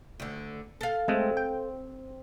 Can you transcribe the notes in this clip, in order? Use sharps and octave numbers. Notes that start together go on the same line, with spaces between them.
D2 D3
A4 F5
G#3 A3 C4
G5